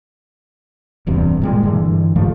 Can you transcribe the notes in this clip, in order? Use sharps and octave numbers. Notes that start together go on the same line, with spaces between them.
D1 E2 G2 C3
A#2 G3 G#3
G2 D3 E3
G2 F3 A3